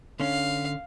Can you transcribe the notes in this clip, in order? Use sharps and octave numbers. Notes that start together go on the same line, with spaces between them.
D3 C#4 F5